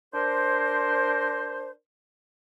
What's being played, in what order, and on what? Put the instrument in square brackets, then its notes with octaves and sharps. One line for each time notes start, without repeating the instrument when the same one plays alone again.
[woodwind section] D4 A#4 C5